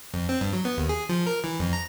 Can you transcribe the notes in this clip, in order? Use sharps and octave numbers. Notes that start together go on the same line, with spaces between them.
F2
C4
G2
F#3
B3
D#2
G#4
F3
A#4
E3
F2
A#5